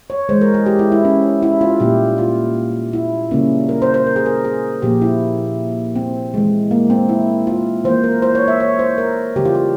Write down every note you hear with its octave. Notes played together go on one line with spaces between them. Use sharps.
C#5
E3 G#3 C5
A#4
G#4
G4
E4
E4
C#4
E4
F4
A#2 G3 A#3 G4
F4
E4
C#3 G3 A#3 C#4
A#4
C5
C5
A#4
G#4
A#4
G#4
A#2 F3 A#3 G4
E4
C4
E3 G#3
A#3
C4
E4
F4
E3 A#3 C5
A#4
C5
C#5
E5
C#5
C5
A#4
C#3 E3 G3 G4
F4
G4